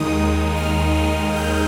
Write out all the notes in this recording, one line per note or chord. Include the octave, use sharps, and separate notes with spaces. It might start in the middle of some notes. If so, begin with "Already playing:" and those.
Already playing: D#2 D#3 G#3 D#4 D#6
F6
G6